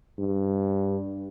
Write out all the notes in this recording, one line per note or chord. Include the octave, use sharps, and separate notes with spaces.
G2